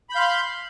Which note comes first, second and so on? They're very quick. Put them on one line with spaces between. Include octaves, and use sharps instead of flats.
B5 G6 F5 C6